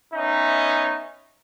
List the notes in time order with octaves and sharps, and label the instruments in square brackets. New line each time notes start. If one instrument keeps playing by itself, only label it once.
[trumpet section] B3 C#4 D#4 E5